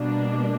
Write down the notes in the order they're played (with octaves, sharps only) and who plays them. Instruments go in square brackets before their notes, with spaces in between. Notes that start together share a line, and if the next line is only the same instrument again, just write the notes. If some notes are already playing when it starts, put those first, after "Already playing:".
Already playing: [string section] B2 G3 A#3 D4